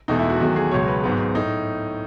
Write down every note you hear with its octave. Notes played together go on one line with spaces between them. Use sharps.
E1 E2 B2 A3 D#4
E4
F#4
E2 D#3 F#3 A3 F#4
G#4
C#2 B2 F#3 C#5
B4
G#1 G#2 F#3 B3
A2 D#4